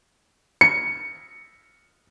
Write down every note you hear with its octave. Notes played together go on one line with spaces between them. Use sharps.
C#7